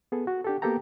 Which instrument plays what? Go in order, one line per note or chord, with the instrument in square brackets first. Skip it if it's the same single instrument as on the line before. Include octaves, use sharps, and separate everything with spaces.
[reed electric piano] B3 G#4 A4
F#4
D4 G4 A4
A#3 B3 G4 A4 G5 A#5